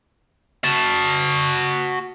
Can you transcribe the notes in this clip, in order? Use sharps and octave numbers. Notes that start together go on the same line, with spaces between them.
F#4 A5